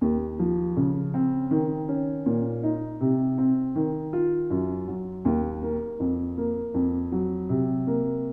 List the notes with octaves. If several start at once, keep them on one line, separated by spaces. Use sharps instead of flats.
D#2
F3
C#3
C4
D#3
C#4
A#2
D#4
C3
C4
D#3
F4
F#2
F#3
D#2
A#3
F2
A#3
F2
F#3
C3
A#3